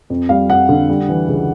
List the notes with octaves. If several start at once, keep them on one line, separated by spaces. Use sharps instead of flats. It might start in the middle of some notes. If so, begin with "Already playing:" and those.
F2
G3 F5
F2 F#5
D3
G3
E3
C#2